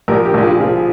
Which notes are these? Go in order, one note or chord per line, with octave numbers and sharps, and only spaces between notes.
A#1 G4 A#4
G4 A#4
A#1
F4 G#4
F3 F4 G#4